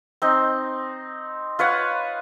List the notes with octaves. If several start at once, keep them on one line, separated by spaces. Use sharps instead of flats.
C4 D#4
F4 B4 C#5 F#5